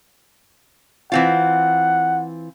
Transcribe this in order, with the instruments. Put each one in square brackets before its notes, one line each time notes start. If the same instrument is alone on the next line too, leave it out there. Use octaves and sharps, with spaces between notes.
[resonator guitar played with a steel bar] E3 C4 F4 [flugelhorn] F#5